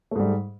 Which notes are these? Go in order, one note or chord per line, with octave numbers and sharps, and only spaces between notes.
G#2 G3 A3